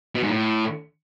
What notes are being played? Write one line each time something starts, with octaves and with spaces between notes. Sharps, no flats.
B2
G#2
A2